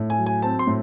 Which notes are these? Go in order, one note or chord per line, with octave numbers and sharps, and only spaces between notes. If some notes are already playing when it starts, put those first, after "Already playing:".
Already playing: A2
G#5
F#3
G#5
C4 A5
C6
A2